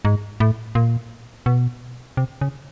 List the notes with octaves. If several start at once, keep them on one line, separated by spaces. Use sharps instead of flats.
G#2
A2
A#2
B2
C3
C#3